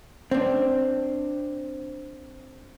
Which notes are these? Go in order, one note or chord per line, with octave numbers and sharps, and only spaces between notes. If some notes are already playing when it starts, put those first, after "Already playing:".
C4 D4